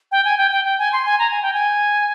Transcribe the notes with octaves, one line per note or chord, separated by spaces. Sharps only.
G5
G#5
G5
G5
G5
G#5
C6
G#5
A#5
G#5
G5
G#5